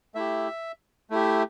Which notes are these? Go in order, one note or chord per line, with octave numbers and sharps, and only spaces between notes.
A3 E4 G4 E5
A3 E4 G4